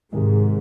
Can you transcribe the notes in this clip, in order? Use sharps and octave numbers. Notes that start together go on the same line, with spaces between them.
G#2 C3 D#3 G#3